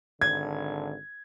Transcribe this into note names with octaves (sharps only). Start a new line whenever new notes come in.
G#1 D3 G#6